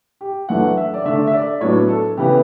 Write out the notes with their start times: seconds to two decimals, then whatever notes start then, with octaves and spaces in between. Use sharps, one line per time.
0.21 G4
0.49 F#2 E3 A3 D4 F#5
0.77 E5
0.94 D5
1.05 D3 A3 D4 E5
1.27 E5
1.33 D5
1.61 A2 F#3 B3 D4 C#5
1.89 A4
2.17 C#3 E3 B3 G4